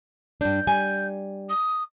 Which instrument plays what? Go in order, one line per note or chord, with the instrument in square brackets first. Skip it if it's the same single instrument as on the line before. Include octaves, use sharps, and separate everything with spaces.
[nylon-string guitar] G2 D4 [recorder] G6
[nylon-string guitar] G3 G#5
[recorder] D#6